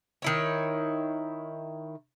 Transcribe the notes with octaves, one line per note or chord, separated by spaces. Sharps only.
D#3 E4 C#5